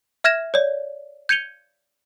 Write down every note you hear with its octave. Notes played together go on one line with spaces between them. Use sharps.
E5 F6 G#6 A#6 E7
C#5 D5
G6 G#6 C#7 D#7 F7 G7